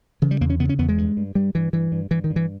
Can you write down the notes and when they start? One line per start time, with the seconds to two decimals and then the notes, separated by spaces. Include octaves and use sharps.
0.22 C#3 E3
0.31 G3
0.41 E2 A#3
0.50 C#4
0.60 C#3 B3
0.69 C#4
0.79 E2 B3
0.89 G#3
0.98 G2
1.17 G2
1.35 G2 G3
1.55 G2 E3
1.73 G2 E3
1.92 G2
2.11 G2 E3
2.24 D#3
2.30 G2
2.36 E3